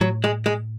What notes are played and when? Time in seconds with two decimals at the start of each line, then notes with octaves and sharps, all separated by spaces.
0.01 A2 F#3
0.24 G#3
0.46 G#3